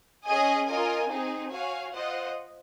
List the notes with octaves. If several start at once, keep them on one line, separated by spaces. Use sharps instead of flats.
C#4 G#4 D#5 G#5
F4 A#4 D#5 G#5
C4 D#4 G#4
F#4 C#5 F5 G#5
F4 C5 D#5 F#5